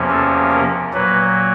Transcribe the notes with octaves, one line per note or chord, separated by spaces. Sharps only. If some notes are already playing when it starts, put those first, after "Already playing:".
Already playing: E2 C3 F3 A#3 C#4
A4
A#4
A#2 F#3 A#3 B4